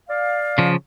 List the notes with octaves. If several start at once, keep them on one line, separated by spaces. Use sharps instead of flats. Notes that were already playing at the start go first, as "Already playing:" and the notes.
D5 F5
C#3 F3